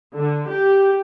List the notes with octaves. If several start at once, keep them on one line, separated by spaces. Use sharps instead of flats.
D3
G4